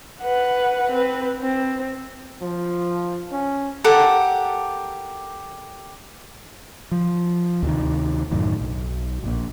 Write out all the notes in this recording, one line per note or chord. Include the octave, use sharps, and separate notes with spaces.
B4 F#5
C4 B4
C4
F3
C#4
G4 A4 A#4 F#5
F3
D2 C3 D#3
C2 F#2 A2 D#3
B1
A#1 A#2